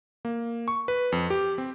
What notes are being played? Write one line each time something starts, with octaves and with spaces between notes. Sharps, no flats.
A#3
C#6
B4
F2
G4
C4